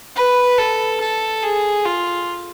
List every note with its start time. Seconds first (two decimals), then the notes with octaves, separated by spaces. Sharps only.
0.16 B4
0.59 A4
1.01 A4
1.43 G#4
1.86 F4